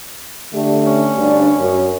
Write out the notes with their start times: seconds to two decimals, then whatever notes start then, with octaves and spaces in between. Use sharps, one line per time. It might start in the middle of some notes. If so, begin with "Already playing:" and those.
0.54 D3 A3 G4
0.87 C#4
1.18 D2 G2 D4
1.60 F#2